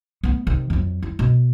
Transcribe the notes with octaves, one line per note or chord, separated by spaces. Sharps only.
A3 B3
C3 D#3
F2 F#3
E4
B2